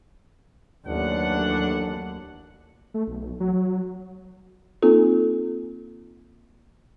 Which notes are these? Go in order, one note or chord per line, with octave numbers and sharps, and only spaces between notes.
A1 D#2 F#3 D4 F#5
A3
B1
F#3
F#3
A#3 C4 D#4 F4 A4